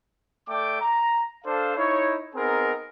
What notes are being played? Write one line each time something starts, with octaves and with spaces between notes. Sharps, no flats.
A3 D5 G5 D6
A#5
D4 A4 C5 F5
D#4 E4 C#5
B3 C4 D#4 G#4 A#4